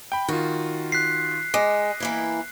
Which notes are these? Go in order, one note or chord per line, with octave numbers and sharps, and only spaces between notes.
G5 B5
D#3 F4 F#4
F#6 B6 C7
G#3 D#5 D6 A#6
E3 A#3 E4